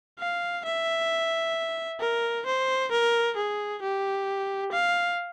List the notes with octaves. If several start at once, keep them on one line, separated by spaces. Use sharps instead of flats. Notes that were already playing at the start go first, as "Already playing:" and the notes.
F5
E5
A#4
C5
A#4
G#4
G4
F5